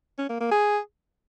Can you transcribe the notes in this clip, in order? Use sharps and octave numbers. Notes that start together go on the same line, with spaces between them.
C#4
A#3
A#3
G#4